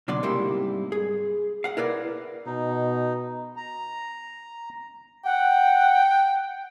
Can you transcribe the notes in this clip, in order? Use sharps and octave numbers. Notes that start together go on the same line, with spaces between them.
B2 D3 F#3 D4 D5 C6
G#2 C3 G3 A#3 E4 C6
G#4
F5 F#5
E4 A#4 B4 D5
B2 D#4
A#5
F#5 G5